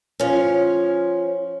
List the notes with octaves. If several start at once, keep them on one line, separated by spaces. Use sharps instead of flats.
F3 C#4